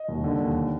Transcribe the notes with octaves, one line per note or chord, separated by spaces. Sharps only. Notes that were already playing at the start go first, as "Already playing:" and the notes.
Already playing: D#5
D#2
D3
D#2